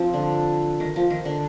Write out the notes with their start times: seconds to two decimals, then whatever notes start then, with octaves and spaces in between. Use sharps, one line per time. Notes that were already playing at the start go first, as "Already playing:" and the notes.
Already playing: F3 C4
0.14 D3
0.80 D#3
0.96 F3
1.10 D#3
1.25 D3